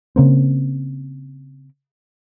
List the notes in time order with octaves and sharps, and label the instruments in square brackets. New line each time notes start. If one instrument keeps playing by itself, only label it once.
[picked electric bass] C#3 A#3 C4